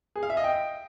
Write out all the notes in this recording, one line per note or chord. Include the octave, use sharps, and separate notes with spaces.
G#4
F5
E5
D#5
G5